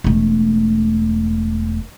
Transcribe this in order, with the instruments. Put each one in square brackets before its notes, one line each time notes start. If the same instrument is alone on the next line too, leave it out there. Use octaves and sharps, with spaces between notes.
[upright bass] E1 A3